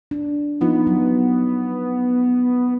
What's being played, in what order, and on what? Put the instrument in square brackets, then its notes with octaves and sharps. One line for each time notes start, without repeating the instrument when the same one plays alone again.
[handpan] D4
[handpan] F3 D#4 F4 [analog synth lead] B3
[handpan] F#3